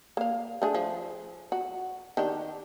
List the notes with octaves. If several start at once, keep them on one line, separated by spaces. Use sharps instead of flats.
A#3 F5
A3 D4 G#4
F3
F#4
D#3 D4 G4